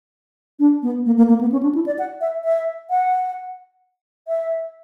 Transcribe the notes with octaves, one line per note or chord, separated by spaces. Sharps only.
D4
B3
A#3
A#3
A#3
B3
C#4
D4
E4
D5
F#5
E5
E5
F#5
E5